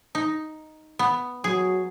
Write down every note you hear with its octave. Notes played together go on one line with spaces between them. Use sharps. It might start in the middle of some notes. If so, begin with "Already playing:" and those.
D#4
B3
F#3 G#4